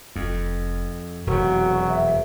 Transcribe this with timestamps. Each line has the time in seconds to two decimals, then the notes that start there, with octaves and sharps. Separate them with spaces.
0.16 F1 F2
1.27 E1 F2 C3 F#3 F#4
1.88 E5